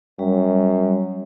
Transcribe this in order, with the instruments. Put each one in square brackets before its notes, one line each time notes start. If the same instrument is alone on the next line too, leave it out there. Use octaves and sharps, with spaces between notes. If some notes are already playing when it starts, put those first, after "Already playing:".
[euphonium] F#2 [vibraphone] G3